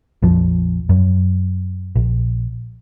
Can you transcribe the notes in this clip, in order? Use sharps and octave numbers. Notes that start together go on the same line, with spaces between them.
A#1 F2 F3
F#2
A#1